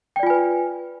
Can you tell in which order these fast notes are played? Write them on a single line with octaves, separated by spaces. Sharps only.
G5 D5 F4 G#5 B4